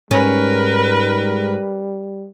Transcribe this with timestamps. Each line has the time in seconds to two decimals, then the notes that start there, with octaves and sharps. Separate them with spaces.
0.11 G#2 G3 C#4 A#4 B4